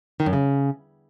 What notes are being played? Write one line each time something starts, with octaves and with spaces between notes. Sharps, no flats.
D#3
F#2
C#3